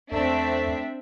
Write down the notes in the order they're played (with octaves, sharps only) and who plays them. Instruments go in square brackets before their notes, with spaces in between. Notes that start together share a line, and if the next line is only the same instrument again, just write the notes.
[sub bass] E2 [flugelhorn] A3 [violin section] C4 D4 E5